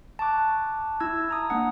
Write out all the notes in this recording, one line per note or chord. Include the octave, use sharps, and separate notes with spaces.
A5 C#6 D6 F#6
E4 E6 G#6
A5 A#5 D#6
A#3 D4 F#5